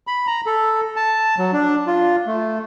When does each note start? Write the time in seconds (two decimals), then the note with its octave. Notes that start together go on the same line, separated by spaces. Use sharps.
0.07 B5
0.27 A#5
0.46 A4
0.96 A5
1.38 F#3
1.53 D4
1.87 F4
2.27 A3